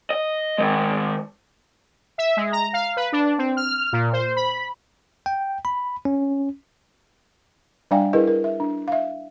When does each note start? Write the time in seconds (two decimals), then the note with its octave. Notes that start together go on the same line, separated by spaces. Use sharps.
0.10 D#5
0.58 D#3 G#3
2.18 E5
2.37 G#3
2.52 A#5
2.73 F5
2.97 B4
3.12 D4
3.38 C4
3.57 F6
3.93 A#2
4.13 C5
4.36 B5
5.26 G5
5.65 B5
6.05 C#4
7.91 G3 D4 D5 F5 G5 G#5
8.13 E4 G#4 A#4 B4 D#5
8.27 A#4
8.44 E5
8.60 D4
8.88 E5 F5